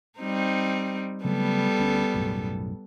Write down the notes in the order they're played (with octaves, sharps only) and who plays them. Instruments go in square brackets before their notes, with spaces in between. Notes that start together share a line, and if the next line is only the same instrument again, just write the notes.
[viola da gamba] G3 C4 D#4
[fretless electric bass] C#3 F#3 A3 [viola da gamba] G3 B3 A4
[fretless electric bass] D2 C#4
B1 F#2 A2